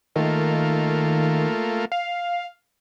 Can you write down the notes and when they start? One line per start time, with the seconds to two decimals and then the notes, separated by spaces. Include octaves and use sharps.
0.16 D#3 A3 A#3 F4
1.92 F5